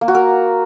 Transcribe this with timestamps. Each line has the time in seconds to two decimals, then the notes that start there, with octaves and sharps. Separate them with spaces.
0.01 A#3
0.08 F#4
0.15 A#4